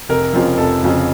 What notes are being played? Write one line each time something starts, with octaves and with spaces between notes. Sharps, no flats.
F1 A#4
F2 C#3 F3
F1 A4
F2 C#3 F3